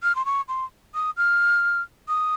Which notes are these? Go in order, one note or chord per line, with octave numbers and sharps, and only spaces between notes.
F6
C6
C#6
C6
D#6
F6
D#6